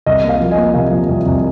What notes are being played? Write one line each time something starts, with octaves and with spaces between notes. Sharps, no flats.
C2 D#5
A#3
F5
F3
D#5 G#5
A#3
C3 F5
F3
C2
C2